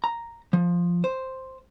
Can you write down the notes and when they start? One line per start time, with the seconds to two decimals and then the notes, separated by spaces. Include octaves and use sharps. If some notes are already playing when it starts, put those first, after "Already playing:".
0.04 A#5
0.53 F3
1.04 C5